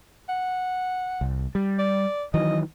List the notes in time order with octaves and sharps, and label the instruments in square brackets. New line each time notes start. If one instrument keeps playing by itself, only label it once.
[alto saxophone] F#5
[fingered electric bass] C2
G3
[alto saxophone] D5
[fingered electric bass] D#3 E3 F#3 [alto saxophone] D#5